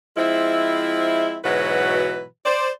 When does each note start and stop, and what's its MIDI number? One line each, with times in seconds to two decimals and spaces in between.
0.17 1.37 53
0.17 1.37 56
0.17 1.37 60
0.17 1.37 64
1.44 2.25 44
1.44 2.25 47
1.44 2.25 52
1.44 2.25 54
1.44 2.25 66
1.44 2.25 71
2.45 2.69 72
2.45 2.69 74